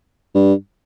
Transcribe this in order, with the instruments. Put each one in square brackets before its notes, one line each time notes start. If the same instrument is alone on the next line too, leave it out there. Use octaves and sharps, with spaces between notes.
[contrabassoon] G2